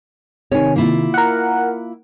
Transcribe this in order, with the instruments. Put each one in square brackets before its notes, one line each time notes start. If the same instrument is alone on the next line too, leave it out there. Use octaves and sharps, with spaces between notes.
[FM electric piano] C3 D#3 [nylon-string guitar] C#5 G#5
[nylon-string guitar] A#3 E4 F4
[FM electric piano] A#4 F#5